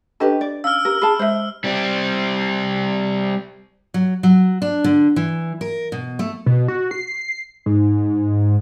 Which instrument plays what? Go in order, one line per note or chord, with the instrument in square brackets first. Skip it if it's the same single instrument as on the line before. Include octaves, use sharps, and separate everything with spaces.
[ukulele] C#4 G4 B4 [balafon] D4 A4 D#5
[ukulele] D5
[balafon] C#4 F5 [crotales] E6 F6
[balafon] G4 [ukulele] A#4
[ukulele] G#4 A5 [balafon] B5
[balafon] G#3 E5 [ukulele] C5
[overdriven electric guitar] G3 C4
[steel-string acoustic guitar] F#3
F#3
D4
D3
E3
A#4
B2
A3
[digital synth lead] B2
F#4
C7
G#2